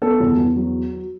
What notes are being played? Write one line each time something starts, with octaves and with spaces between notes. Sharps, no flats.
B3 A4
E2
E2
F#3